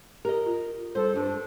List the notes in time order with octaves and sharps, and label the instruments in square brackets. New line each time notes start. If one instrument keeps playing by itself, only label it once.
[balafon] G4 [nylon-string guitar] A#4 D#5
[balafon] F4
[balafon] G3 [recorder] A4 [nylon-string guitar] C5
[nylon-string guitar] G2 [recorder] D4